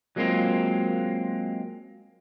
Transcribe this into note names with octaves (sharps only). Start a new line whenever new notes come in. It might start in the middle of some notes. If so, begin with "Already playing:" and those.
F#3 G#3 A#3 C4 F4